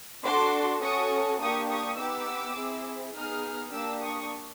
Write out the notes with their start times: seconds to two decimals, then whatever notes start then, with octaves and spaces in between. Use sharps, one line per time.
0.24 D4 F#4 A4 C6 D6
0.82 C#4 F#4 A4 C#6 D#6
1.40 A#3 D4 G4 C#6 D#6
1.69 C#6 D#6
1.99 B3 D#4 G4 D6 E6
2.57 C4 E4 G#4
3.15 B3 D#4 G#4 D#6 F6
3.73 A#3 D4 G4 D6 E6
4.02 C#6 D#6